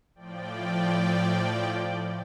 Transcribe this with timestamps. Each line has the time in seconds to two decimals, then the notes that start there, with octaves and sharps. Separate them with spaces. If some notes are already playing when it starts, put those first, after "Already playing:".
0.15 A2 F3 D5 G5